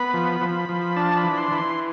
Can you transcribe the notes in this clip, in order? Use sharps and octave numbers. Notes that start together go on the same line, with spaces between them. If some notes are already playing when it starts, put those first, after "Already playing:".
Already playing: B3 B5
F3
F3
F3
D4 A5
B5
E3
C6
E3 B5
C6